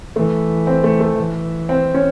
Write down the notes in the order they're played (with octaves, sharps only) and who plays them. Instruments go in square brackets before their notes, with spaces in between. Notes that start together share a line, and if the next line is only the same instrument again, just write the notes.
[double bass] E3 [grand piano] A3
[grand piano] C4
A3
A3
[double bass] E3
[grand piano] C4
C#4